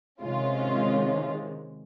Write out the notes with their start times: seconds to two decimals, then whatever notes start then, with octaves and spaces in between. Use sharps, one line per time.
0.22 C3 D#3 G#3 C#4 F4